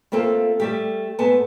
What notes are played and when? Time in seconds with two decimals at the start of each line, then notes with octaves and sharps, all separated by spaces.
0.12 A3 A#3 C4 F4 A4
0.60 G3 A3 G4
1.19 G#2 A3 B3 G#5 A5